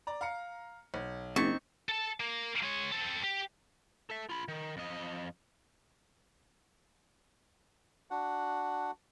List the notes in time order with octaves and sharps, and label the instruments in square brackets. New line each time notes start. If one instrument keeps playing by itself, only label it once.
[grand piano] D5 A#5
F5 A#5 C#7
B1
[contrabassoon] F#1 [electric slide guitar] C4 D#4 [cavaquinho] C#6 [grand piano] G#6 A6 B6
[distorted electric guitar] A4 A5
A#3
G#3 C#5
C4 A4
G4
[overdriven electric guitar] A4 E5
F4 B5
D#3
F2 D#5
[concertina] D4 F#4 F#5